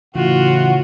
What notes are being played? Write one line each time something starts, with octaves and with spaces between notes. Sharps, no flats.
A2 C#3 E3 F4 F#4 F#5